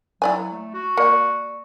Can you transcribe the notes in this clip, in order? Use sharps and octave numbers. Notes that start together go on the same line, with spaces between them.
F#3 E4 D5 G#5
A3
F#4
A#3 D5 C#6 C#7